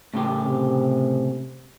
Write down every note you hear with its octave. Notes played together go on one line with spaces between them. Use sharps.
A2 C#3 G4
C3